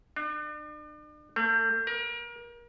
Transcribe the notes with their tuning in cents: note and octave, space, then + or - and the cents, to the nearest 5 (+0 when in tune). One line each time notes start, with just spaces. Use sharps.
D4 +40
A3 +45
A#4 +35